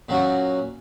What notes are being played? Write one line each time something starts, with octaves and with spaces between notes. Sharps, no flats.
A#2 F#3 C#4 F#4